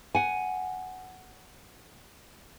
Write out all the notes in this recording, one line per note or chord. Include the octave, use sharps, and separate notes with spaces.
F#5 G#5